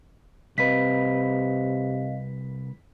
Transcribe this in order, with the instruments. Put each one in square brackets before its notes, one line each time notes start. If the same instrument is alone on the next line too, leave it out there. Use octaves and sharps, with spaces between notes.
[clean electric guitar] C2 B4 [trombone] C3 [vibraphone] C4 D#5 F5 [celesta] B6